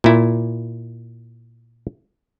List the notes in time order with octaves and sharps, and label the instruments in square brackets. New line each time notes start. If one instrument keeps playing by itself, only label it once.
[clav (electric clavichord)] A#2 E4